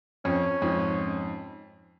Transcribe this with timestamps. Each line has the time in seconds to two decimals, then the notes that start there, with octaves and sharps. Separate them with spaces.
0.25 F2 C#4
0.62 F2 G#2